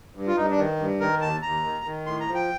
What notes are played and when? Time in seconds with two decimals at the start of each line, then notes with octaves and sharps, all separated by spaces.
0.15 G2
0.27 F4
0.36 G2 D#4
0.50 D4
0.58 D#3
0.79 G2
1.00 D#3 A#4
1.21 D#2 A5
1.42 D#2 A#5
1.64 D#3
1.85 D#3
2.06 A2 C6
2.20 A#5
2.28 F3
2.35 G5